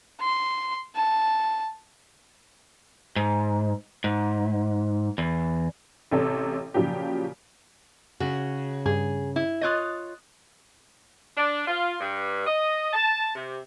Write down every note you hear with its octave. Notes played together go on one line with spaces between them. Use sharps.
C6
A5
G#2
G#2
E2
A1 C3 A4 C#5
A#2 C#3 F3 F#3 G4
C#3 F#4
G2 G#4
E4
F4 C#5 D#5 D#6 F#6 A6
D4
F4
G2
D#5
A5
C3